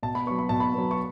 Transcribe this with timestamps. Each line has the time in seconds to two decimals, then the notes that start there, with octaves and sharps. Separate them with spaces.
0.03 B2 A5
0.15 B5
0.26 B3 C#6
0.30 F#3
0.39 B5
0.49 B2 A5
0.60 B5
0.74 F#3 B3
0.91 C#6